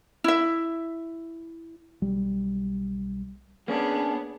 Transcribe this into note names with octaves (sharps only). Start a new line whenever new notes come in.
E4 E5
B1 G3
A#3 B3 C#4 D4 G#4